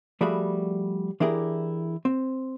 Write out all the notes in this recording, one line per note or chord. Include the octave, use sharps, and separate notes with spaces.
F3 G3 A3 F#4 G#4 B5
E3 D4 E4 G4 G#4 A#4
C4